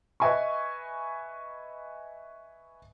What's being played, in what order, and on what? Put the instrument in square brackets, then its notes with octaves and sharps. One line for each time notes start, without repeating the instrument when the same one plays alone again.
[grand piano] B4 D#5 E5 G#5 B5 C#6